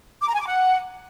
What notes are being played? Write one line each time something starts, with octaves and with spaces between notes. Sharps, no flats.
D6
A#5
G#5
D6
F#5